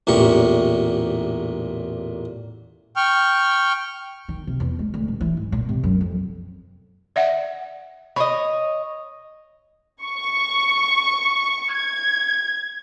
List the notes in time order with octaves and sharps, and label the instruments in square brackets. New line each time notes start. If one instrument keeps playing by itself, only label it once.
[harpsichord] A1 E2 A#2 G4 C#6
[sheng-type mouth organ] G5 C#6 F6
[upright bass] D#3
C3
E2
G#3
D2
D#1
E3
G#2
A#2
C3
F#2
F2
[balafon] D5 E5 F#5
[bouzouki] C#5 D#5 [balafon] B5
[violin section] C#6
G#6